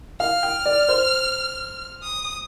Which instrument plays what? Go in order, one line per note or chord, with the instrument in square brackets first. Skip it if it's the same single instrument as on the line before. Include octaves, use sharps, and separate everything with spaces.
[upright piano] F5 [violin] F6
[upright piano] G5
D5
C5
[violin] D#6